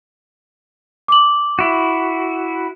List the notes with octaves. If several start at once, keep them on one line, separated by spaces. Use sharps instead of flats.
D6 F#7
E4 F#4